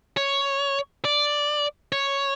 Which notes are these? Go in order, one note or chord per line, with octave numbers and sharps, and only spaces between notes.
C#5
D5
C#5